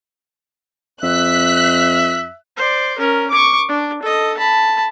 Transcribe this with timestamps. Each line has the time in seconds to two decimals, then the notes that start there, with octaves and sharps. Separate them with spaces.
1.03 F2 E5 F#6 B6
2.57 C5 D5
2.98 C#4 A#4
3.31 C#6 D6
3.69 D4
4.02 A4 D#5
4.37 A5 B5